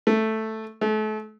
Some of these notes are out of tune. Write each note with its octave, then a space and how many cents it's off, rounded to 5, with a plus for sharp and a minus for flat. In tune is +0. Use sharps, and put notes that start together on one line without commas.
A3 +0
A3 -35